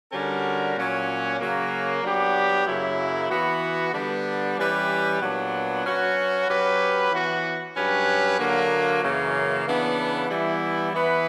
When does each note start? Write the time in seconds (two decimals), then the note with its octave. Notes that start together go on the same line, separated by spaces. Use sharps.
0.12 D3 G3 C#4 F#4 A#4
0.76 A#2 F#3 C#4
1.39 C#3 F#3 A#3
2.02 F#3 B3 D4 G4
2.66 F#2 C#3 F#3 A#3 E4
3.29 E3 B3 F#4
3.93 D3 G3 B3 D4
4.57 E3 G3 C#4 G4 B4
5.21 A#2 F#3 B3 D4
5.84 F#3 C#4 F#4 B4
6.47 F#3 C#4 G4 B4
7.11 E3 B3 F#4
7.74 G2 F#3 C#4 G4 B4
8.38 D3 F#3 A#3
9.02 F#2 C#3 E3 A#3
9.65 C#3 E3 B3 D4
10.29 E3 G3 B3 E4
10.92 E3 B3 E4 B4